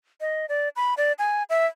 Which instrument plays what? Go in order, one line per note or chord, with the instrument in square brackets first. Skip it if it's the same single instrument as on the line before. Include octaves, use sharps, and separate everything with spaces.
[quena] D#5
D5
B5
D5
G#5
E5